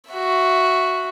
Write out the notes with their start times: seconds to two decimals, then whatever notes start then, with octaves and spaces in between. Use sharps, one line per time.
0.11 F#4 E5